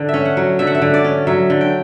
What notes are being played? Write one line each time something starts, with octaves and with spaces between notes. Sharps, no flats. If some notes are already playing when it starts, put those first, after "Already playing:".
Already playing: D3
E5
C#4
F#5
F#3
D3 E5
F#5
E5
D3
D5
C#4
F#3 E5
D3
G5